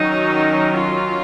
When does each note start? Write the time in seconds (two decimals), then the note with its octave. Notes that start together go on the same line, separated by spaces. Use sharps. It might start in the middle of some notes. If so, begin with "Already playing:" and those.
Already playing: D#3 F#3 C#4 D#4
0.74 F4